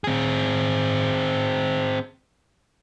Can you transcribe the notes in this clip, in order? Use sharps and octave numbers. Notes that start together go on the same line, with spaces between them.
C4 G#4